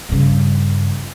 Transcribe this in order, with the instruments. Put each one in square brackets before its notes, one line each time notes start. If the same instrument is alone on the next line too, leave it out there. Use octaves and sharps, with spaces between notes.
[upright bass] G2 C#3